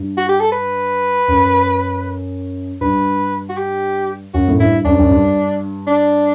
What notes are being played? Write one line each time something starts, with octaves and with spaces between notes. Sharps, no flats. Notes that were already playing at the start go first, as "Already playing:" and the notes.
Already playing: G2
F#4
G4
A4
B4
F#2
G2 B4
F#4
G4
F#2 F#4
A2
G2 E4
F#2 D4
G2
F#2
G2
D4